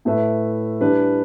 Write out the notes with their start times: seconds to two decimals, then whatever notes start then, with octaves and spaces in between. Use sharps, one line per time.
0.05 A2 A3 E4 B4 E5
0.81 E3 G3 D4 B4